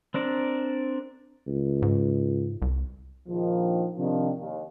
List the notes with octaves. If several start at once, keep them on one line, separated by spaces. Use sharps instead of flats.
C4 D4 A#4 D5
C#2
G#2
C2
A#1 D#3 F3
C3 D#3 F3 D4
D#2